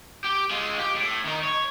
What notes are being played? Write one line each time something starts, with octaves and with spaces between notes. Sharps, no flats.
G4
G#3 F4
G4
A2
D#3 D#4
C#5